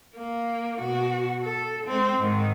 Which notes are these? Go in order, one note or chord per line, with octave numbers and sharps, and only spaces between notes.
A#3
B2 F#4
A4
G#3 C4
G#2 D#3